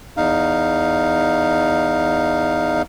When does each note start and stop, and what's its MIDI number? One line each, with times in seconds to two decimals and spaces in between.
0.17 2.82 40
0.17 2.82 63
0.17 2.82 77